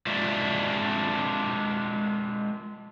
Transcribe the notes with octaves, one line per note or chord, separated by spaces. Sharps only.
G#3 D4 F4 D5 E5